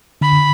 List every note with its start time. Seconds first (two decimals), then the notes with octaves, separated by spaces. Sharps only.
0.21 D3 B5